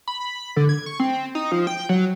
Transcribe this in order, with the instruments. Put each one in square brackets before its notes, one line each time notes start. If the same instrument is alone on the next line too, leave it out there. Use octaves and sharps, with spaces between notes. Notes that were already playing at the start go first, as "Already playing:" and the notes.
[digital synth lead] B5
D3
G#6
C#6
C4
D#4
F3
G5
F#3